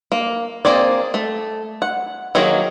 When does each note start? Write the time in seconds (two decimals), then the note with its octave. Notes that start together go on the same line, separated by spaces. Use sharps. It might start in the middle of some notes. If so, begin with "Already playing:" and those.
0.12 A#3
0.65 A#3 C4 G#4 D5
1.14 A3
1.82 F#5
2.35 D#3 F#3 A#3 G#4